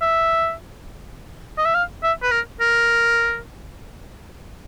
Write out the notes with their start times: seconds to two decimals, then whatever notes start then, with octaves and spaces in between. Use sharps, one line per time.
0.01 E5
1.58 D#5
1.66 E5
1.74 F5
2.03 E5
2.23 B4
2.31 A#4
2.61 A#4